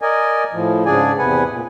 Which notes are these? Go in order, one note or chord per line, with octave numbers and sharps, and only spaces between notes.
A#4 D5 D#5 G#5
A2 F3
G#2 C#3 D4 G#4 D5 G#5
E2 C3 B4 F#5 G#5
A#2